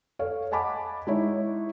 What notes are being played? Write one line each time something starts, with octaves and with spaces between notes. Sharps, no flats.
A4 C#5 F5
D#5 F#5 G#5 A5 B5 D6
G#3 D#4 E4 C#5